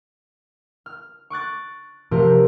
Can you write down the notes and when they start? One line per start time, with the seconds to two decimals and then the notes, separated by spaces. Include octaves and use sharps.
0.86 F6
1.30 C#6 D6 F#6 A6
2.11 C3 F3 A3 C4 G4 A#4